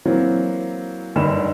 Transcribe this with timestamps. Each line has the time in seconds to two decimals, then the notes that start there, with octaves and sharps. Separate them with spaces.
0.05 E3 F#3 A#3 C4
1.16 F#1 G2 D3 D#4 B5 E7